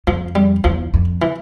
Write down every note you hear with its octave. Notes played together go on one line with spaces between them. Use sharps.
F2 F3
G3
E2 F3
F2
E3